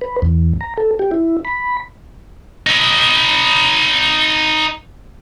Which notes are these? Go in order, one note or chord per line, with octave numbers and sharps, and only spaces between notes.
B4
E2
A#5
A4
G4
E4
B5
D#4 B4